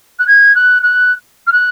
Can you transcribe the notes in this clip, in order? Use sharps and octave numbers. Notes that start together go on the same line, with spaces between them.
F#6
G#6
F#6
F#6
F6
F#6